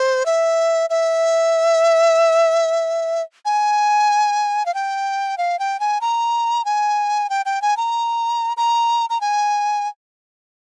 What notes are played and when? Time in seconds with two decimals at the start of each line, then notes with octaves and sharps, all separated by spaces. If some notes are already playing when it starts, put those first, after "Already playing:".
Already playing: C5
0.26 E5
0.90 E5
3.45 G#5
4.66 F5
4.74 G5
5.38 F5
5.59 G5
5.80 G#5
6.01 A#5
6.65 G#5
7.30 G5
7.46 G5
7.62 G#5
7.77 A#5
8.57 A#5
9.10 A#5
9.21 G#5